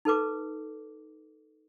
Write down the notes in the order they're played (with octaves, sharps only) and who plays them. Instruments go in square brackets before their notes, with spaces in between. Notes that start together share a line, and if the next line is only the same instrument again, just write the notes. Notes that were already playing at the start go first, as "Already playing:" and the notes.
[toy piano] D#4 A4 B4 D6